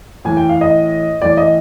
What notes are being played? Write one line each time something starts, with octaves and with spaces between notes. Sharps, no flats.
A2 E3 G#5
G5
F5
D#5
A2 E3 D5
D#5